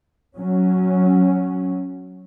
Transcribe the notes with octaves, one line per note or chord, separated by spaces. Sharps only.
F#3 C#4